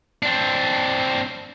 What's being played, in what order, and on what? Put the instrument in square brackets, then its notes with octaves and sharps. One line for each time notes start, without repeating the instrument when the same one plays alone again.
[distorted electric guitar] C4 D4